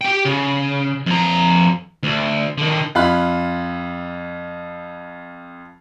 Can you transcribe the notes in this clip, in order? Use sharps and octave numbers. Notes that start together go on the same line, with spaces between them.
G4 G5
C#3
F2 A#5
D2
D3 D#3
F2 F4 B5 F#6